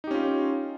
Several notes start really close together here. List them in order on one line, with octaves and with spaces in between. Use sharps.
D#4 G4 C#4 F4